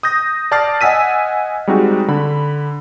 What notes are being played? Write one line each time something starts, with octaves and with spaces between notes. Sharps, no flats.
D#6 G6 A#6
D5 A5 D6 F6 A6 C7
D#5 F#5 G#5 E6 B6 D#7
G3 G#3 C4 D#4 F#4
D3 B5